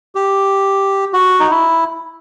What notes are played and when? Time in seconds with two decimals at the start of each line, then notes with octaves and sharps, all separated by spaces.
0.15 G4
1.13 F#4
1.40 D#4
1.51 E4